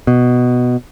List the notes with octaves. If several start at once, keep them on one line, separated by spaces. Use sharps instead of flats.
B2